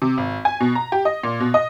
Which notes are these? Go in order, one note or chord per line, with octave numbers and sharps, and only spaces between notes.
C3
G#1
G#5
B2
A#5
G4
D#5
A#2
B2
D#5